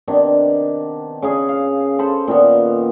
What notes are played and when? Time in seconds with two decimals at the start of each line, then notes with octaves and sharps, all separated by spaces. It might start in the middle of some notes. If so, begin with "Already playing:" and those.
0.08 C3 D#3 B3 D4
1.22 C#3 G#4
1.49 F5
1.99 A4 C5 B5
2.28 A#2 D#3 B3